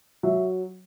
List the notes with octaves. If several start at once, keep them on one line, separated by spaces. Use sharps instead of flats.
F#3 E5